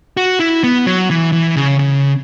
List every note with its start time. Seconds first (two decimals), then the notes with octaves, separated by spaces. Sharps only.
0.17 F#4
0.40 E4
0.64 B3
0.86 F#3
1.11 E3
1.33 E3
1.56 C#3
1.79 C#3